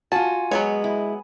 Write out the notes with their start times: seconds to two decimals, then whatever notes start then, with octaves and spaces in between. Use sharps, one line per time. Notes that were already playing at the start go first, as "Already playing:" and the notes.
0.12 F4 F#4 G#5 A5
0.51 F#3 G#3 B3 C#5
0.84 E4